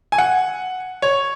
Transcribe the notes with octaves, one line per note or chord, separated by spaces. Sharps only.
G#5
F#5
C#5